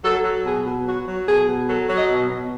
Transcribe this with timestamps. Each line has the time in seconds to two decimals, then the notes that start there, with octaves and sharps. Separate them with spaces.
0.04 F#3 A4
0.25 F#3
0.45 B2 G#4
0.66 B2
0.87 F#3 F#4
1.07 F#3
1.27 B2 G#4
1.48 B2
1.68 F#3 A4
1.89 F#3
1.96 D#5
2.10 B2
2.30 B2